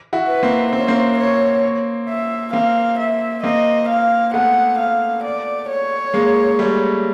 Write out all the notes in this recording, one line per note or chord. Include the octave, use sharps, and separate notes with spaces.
E4 F#4
B4
A#3 C4
C4 C5
C#4
A#3 C4
C#5
E5
A#3 C4 F5
E5
A#3 C4 D#5
F5
A3 B3 F#5
F5
D5
C#5
G#3 A#3
G3 A3